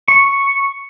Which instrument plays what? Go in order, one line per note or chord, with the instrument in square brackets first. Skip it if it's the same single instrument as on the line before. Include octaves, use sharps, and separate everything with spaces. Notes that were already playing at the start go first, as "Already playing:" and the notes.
[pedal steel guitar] C#6